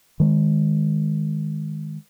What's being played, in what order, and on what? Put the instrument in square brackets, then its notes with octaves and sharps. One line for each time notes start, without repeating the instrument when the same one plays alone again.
[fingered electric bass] D#3 G#3